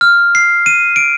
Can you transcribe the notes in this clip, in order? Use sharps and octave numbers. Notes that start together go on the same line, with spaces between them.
F6
C7
D#7
D7